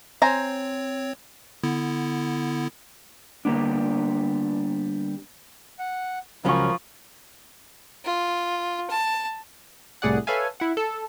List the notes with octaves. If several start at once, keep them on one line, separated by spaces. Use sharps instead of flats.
C4 C5 C#5 G#5 A#5
D3 B3 E4
D3 G3 A#3 B3 D4
F#5
C#2 F3 F#3 C#4 A#4 B5 C#6
F4
A5
C2 A2 G#4 D5 F#5
A4 B4 C#5 E5 F5 G#5
E4 F#5
A4